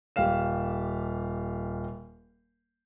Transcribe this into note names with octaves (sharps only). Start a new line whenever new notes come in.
D#1 G4 F5 E7